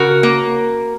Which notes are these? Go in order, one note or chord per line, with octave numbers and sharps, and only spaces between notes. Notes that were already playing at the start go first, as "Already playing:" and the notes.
Already playing: C#3 F#4 A#4
A#3